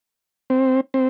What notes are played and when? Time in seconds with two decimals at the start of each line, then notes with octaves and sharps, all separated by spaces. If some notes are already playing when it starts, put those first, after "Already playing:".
0.50 C4
0.94 C4